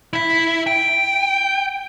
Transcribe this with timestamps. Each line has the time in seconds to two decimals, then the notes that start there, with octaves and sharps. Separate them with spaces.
0.13 E4 E5
0.67 G5